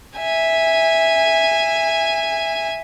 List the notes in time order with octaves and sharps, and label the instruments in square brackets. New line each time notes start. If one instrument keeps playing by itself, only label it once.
[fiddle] E5 G#5